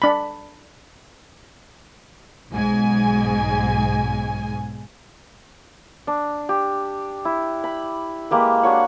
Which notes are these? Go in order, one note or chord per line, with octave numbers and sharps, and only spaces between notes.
D4 B5
B1 G#2 G#5
D4
G4
E4
B5
G#3 A#3 G4 B4
D4 F#4 C#5 F#5